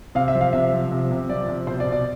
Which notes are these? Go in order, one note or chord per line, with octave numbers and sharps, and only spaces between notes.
C3 F5
E5
F3
F5
C3 E5
F3
C3
C3
F3 D5
C3
B2 C5
D5
B2
D5